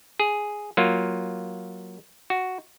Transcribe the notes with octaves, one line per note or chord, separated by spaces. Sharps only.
G#4
F#3 A#3 F4
F#4